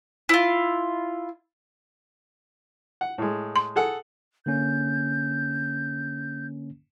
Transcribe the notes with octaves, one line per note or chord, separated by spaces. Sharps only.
E4 F4
F#5
A2 G#3
C6
G#4 A4 F#5
D3 A#3 C#4 G6